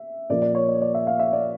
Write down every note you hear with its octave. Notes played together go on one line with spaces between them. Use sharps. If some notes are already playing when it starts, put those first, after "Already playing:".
Already playing: E5
A#2 F3 A#3 D5
D5
C#5
D5
D5
E5
F5
E5
D5